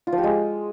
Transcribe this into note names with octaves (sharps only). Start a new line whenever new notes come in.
F4
F3
G4
G#3